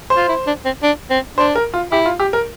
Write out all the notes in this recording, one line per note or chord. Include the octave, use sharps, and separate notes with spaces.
C5
F4
E4
D4
C4
D4
C4
D4 C5
A#4
F4
E4 G4
F4
G4
A#4